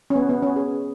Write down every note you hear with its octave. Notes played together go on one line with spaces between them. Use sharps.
C#4
B3
B3
C#4
G#4